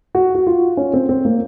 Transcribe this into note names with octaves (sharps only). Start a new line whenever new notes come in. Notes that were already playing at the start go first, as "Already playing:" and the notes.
F#4
F#4
F4
C#4
C4
C4
A#3